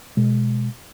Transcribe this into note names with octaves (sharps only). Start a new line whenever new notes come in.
B2 G#3